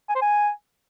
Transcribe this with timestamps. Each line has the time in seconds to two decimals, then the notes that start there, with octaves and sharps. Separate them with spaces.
0.09 G#5
0.16 C5
0.22 G#5